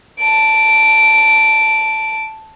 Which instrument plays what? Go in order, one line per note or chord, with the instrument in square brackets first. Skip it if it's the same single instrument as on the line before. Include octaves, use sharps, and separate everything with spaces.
[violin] A5 D7